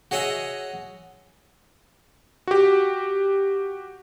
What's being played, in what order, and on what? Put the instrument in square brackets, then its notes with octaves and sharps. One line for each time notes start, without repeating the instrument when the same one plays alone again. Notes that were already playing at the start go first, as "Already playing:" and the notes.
[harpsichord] F#4 G#4 C#5 D#5 E5 F#5
[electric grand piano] F#4 G4